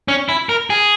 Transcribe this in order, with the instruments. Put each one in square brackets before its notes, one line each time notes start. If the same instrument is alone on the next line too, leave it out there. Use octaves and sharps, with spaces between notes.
[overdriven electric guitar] C#4
E4
A#4
G#4